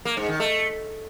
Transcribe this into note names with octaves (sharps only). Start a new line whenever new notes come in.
A#3
G#2
D#3
A3